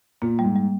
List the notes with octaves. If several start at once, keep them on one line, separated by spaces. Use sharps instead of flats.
A#2 A#3
G3
G#2
G3